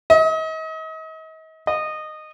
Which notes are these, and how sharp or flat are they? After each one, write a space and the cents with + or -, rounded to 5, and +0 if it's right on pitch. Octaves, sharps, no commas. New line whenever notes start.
D#5 +40
D#5 -15